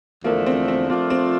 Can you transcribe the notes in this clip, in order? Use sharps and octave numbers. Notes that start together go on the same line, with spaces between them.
E2 D3 F3 A3 A#3 D4
C4
C4
F3 A3 C4 D4 F4
C4